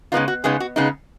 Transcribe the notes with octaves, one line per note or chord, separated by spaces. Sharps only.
C#3 G#3 B3 D#4 F4
F#4
C#3 G#3 B3 D#4 G#4
F#4
C#3 G#3 B3 D#4